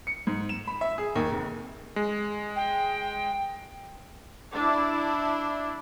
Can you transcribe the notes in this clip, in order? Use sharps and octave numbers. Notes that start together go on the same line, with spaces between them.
C#7
G#2
E7
B5
E5
G#4
D#2
F1
G#3
G5
D4 E4